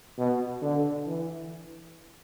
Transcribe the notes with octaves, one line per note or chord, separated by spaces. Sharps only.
B2
D3
E3